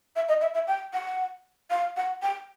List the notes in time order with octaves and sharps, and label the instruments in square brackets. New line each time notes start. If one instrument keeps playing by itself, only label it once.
[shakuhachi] E5
D#5
E5
E5
G5
F#5
F5
F#5
G5